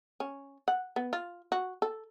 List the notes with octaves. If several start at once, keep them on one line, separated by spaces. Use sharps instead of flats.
C#4
F#5
B3
F4
F#4
A4